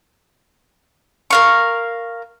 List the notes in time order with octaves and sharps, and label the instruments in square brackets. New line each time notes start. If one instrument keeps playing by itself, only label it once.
[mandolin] A#4 F5 C#6